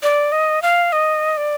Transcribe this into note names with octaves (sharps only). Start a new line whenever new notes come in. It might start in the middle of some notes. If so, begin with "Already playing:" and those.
D5
D#5
F5
D#5
D5